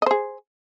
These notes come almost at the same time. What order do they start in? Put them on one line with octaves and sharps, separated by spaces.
D#5 C5 G#4